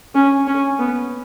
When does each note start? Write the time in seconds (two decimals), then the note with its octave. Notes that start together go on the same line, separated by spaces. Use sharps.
0.15 C#4
0.47 C#4
0.79 B3